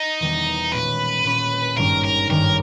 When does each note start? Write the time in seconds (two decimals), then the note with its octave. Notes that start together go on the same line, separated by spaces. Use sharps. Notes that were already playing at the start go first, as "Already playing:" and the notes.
Already playing: D#4
0.20 E1 E2 D#3 G3
0.71 A#2 G#3 C#4 B4
1.24 A#2 G#3 C#4
1.77 G#1 G2 D#3 G3 C#4 A#4
2.04 A#4
2.29 G#1 G2 D#3 G3 C#4 A#4